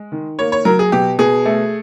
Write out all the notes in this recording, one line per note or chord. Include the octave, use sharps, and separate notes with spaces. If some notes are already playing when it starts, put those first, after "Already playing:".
Already playing: G#3
D#3
A#3 C#5
C#5
F#3 A#4
G#4
B2 G4
B2 G#4
A3